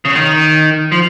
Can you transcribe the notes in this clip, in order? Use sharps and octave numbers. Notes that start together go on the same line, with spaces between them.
C#3
D#3
F3